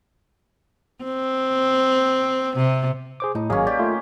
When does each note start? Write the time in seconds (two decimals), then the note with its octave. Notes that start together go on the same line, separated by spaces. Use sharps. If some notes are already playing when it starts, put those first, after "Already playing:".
1.04 C4
2.56 C3
3.20 G#4 C5 D6
3.35 A2 D#4
3.50 G#1 F#3 A#3 C#4 G#4
3.67 G4 D5
3.79 A3 F4